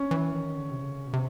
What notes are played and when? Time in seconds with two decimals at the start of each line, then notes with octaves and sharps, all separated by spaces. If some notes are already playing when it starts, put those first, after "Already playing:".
Already playing: C#4
0.11 E3
0.34 D#3
0.58 D3
0.71 C3
0.82 C#3
1.07 B2
1.13 C3